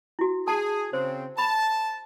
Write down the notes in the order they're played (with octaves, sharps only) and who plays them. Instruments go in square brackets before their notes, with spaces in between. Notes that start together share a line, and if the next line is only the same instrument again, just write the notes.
[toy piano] E4 F#4
[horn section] G#4 [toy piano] A5
[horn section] C#3 C4 [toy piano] C5
[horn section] A5 [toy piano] B5